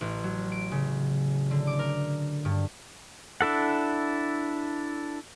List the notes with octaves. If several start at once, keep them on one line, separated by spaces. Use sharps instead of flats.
A1
F#3
D7
C#3
D3
D6
A#4
G2
D4 E4 A4 F#5